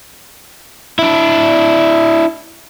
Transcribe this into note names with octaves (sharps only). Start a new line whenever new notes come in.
D4 E4